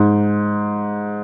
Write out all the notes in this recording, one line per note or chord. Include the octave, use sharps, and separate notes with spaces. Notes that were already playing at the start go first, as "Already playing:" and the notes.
Already playing: G#2